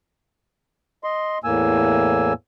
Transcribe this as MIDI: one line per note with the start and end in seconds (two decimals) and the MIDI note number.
1.04 1.38 75
1.04 1.38 84
1.44 2.33 40
1.44 2.33 45
1.44 2.33 58
1.44 2.33 80
1.44 2.33 88